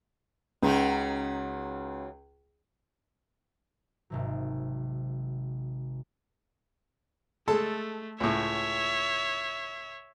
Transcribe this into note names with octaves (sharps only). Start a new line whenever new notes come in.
C#2 C#3 F#3 D#4
G#1 C3 F#3
G#3 A3 A4 A5
C#2 A2 C#5 E5